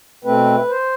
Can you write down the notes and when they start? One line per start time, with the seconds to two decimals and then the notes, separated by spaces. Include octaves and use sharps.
0.25 B2 A3 C4 B4
0.69 C5